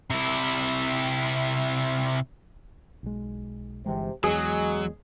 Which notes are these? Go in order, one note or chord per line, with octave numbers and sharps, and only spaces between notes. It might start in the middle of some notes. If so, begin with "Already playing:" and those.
C3 E4
B1 G#3
G1 C3 E3 G#3
E2 F#3 G#3 G#4